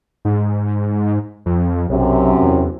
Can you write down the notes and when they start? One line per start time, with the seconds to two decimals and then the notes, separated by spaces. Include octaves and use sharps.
0.25 G#2
1.46 F2
1.90 B1 F#2 C3
2.42 E2